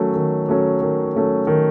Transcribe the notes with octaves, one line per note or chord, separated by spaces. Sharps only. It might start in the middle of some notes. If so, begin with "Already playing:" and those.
Already playing: D#3 F#3 A3 C#4
D#3
F#3 A3 C#4
D#3
F#3 A3 C#4
D#3